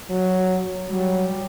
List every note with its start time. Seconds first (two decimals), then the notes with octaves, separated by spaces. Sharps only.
0.10 F#3
0.91 F#3 G3